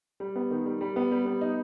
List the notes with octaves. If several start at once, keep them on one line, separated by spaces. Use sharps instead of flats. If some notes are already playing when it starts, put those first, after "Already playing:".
G3
B3
D#3
G3
G3
B3
G3
B3
D#4